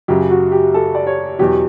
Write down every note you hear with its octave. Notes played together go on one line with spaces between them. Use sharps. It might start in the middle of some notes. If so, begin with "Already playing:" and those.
F#2 C#3 F#3 G4
F#4
G4
A4
D5
C#5
E2 B2 F#3 G4